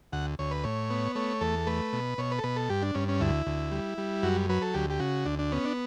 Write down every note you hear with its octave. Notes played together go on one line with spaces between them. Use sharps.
D2 F#5
D2 C#5
B4
A2 C#5
B3
A3 C#5
E2 A4
A3 B4
B2
B2 C#5
B4
A4
B2 B4
A4
G2 G4
D4
G2 C#4
C#4
D2 E4
D2
G3
G3
F#2 F#4
F#3 B4
A4
D2 G4
G4
C#3 F#4
D2 D4
D4
B3 C#4
D4